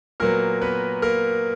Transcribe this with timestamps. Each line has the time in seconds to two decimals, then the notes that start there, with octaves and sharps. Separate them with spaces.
0.20 A#2 F#3 A#3 B3 A#4
0.61 B3 B4
1.02 A#3 A#4